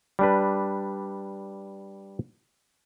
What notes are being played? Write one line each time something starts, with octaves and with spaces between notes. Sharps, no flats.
G3 D4 B4